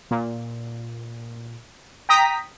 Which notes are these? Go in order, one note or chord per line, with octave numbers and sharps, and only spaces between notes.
A#2
G5 A#5 D#6 B6